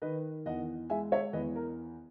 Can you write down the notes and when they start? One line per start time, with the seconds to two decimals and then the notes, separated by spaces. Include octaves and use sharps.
0.02 D#3 B4 D#5
0.46 E2 D#5 F#5
0.90 G#3 E5 G#5
1.12 C#5 E5
1.33 E2 B4 D#5
1.56 A#4